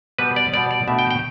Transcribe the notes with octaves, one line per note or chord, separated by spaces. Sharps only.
B2 G3 B3 B4
D5
B2 G3 B3 D5
D5
B2 A3 D4 E5
G5
G5